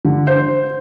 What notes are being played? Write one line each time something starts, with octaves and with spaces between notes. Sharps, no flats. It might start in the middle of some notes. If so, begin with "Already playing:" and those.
D3
C5